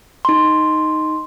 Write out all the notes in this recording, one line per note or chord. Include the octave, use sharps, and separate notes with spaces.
D#4 C6